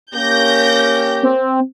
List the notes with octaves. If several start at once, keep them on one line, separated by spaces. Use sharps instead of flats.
A#3 C#4 G4 G6 A#6
C4